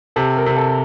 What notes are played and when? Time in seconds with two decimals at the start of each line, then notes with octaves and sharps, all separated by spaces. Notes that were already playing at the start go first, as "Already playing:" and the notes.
0.16 C3 A4
0.37 A#4
0.46 C3
0.56 A4